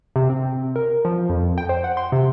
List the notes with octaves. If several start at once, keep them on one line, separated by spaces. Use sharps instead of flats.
C3
C4
A#4
F3
F2
G5
C5
F#5
C6
C3